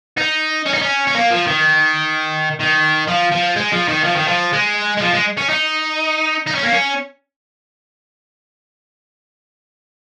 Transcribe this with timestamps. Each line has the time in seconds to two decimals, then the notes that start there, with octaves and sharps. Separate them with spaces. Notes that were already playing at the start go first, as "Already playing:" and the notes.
0.18 D#4
0.66 C#4
0.74 D#4
0.82 C#4
1.07 C#4
1.15 A#3
1.31 F3
1.47 D#3
2.60 D#3
3.08 F3
3.32 F3
3.56 G#3
3.72 F3
3.88 D#3
4.05 F3
4.17 D#3
4.28 F3
4.53 G#3
4.97 G#3
5.01 F3
5.14 G#3
5.37 C#4
5.49 D#4
6.46 D#4
6.55 C#4
6.63 A#3
6.72 C#4